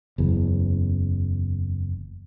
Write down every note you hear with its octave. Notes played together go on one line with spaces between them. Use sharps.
F#1 E2